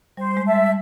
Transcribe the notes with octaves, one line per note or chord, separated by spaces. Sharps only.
G3 C5
G#3
E5 A5
G3